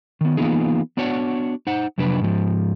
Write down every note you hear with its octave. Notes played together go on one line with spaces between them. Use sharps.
D#3 B3
E3 A#3 B3 D#4 F4 G#4
B3 D4 F#4 C#5 D5 F#5
D#4 C5 F#5
F2 C3 F#3 D4 B4
G#2 F3